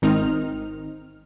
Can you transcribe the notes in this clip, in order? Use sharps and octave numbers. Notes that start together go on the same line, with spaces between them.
G#1 D#3 C4 D#4 F6